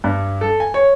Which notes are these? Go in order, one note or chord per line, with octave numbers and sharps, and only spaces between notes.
G2
A4
G#5
C#5